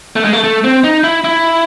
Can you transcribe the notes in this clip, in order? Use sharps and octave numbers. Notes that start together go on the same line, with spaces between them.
A3
G#3
A3
A3
C4
D#4
E4
E4